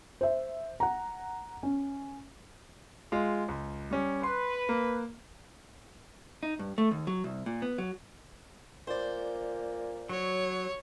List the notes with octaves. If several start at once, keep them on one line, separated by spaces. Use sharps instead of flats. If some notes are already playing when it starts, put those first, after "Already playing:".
C5 E5
F#5 A#5
C#4
G#3 F4
C#2
G3 C#4
B4 C6
A#3
D#4
G2
A3
D#2
F#3
C2
A#2
B3
F#3
A#2 C5 D5
F#3 C#5